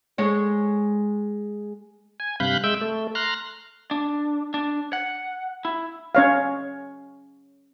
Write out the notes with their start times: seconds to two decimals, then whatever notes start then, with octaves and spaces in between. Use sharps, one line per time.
0.18 G#3 C#5
2.20 G#5
2.40 G2 C3 F5 B5 F#6 G6
2.64 G#3 E5 G5 E6 G6
2.81 A3
3.15 A#5 C6 F6 F#6
3.91 D4
4.54 D4
4.93 F#5
5.65 E4
6.15 C#4 C#5 F5